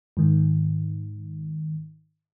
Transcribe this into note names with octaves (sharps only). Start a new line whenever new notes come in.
G#2 D#3